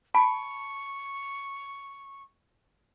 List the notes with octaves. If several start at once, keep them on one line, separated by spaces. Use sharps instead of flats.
A5 B5 C#6